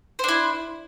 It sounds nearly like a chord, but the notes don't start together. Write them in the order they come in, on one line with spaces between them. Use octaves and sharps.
C5 D4 E4